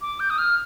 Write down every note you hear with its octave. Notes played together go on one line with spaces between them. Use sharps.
D6
G6
D#6
F6